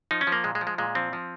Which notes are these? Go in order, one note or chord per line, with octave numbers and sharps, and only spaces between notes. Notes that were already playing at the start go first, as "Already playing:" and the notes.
F3 D#4
C#4
F3
A#3
A#2 G#3
G#3
F3
G#3
A#2 G#3
F3 C4
F3